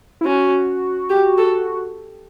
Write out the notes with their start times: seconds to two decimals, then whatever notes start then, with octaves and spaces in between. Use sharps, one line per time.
0.21 E4
0.25 C#4 F#4
1.10 G4
1.38 A4